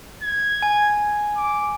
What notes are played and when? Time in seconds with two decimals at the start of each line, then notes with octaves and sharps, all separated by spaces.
0.23 G#6
0.62 G#5
1.37 D6